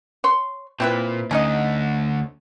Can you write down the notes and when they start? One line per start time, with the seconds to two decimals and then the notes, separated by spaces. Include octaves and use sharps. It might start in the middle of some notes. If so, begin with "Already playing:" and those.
0.24 C#5 C6
0.80 A#2 C4 E4 B4
1.31 D2 D3 C#4 D#4 D#5